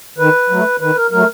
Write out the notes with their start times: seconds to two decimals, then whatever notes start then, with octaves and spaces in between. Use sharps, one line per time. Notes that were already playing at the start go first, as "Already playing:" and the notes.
0.18 D#3 B4
0.50 F#3 A3
0.80 D#3 B4
0.96 A#4
1.11 F#3 A3 A#4